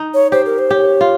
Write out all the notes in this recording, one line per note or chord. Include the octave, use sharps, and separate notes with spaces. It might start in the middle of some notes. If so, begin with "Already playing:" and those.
Already playing: D#4
C#5
G4 C5
A#4
C5
G4 C#5
F4